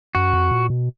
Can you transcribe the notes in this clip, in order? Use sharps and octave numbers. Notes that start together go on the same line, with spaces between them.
F#2 F#4
F2
A#2
B2